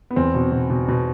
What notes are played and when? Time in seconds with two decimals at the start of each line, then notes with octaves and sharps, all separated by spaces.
0.11 B3
0.16 E2 C4
0.35 B2
0.52 B2
0.70 B2
0.88 B2